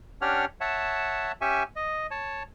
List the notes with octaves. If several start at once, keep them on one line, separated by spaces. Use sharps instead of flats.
C#4 D4 G4 C#5 F#5 F6
C#5 E5 F#5 A5
C#4 G4 E5 G#5 C#6
D#5
C#5 A5